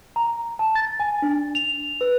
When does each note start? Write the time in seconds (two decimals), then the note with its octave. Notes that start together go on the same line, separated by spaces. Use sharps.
0.16 A#5
0.59 A5
0.75 A6
1.00 G#5
1.22 D4
1.55 F7
2.01 B4